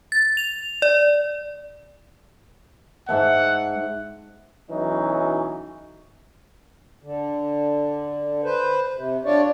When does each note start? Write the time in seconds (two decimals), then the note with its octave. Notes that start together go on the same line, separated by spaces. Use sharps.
0.12 A6
0.37 F7
0.82 D5
3.09 G#2 E5 F#5 A5
4.71 B1 E3 F#3 C#4 D#4
7.03 D3
8.44 B4 C5
8.94 C3
9.25 D4 F4 C#5 D5